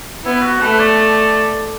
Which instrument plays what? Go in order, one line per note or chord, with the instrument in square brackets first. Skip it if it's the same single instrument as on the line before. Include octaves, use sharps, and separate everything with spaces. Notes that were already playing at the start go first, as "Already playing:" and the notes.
[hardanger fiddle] B3 [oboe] E4
[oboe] F#4
[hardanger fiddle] A3 [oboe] B4
[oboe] D5